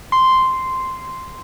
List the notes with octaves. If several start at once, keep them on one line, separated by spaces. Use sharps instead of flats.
C6